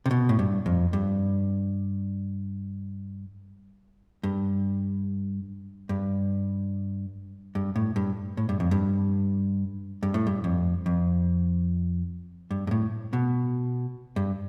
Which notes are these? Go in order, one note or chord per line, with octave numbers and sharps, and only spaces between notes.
C3
B2
A2
G2
F2
G2
G2
G2
G2
A2
G2
A2
G2
F2
G2
G2
A2
G2
F2
F2
G2
G2
A2
B2
G2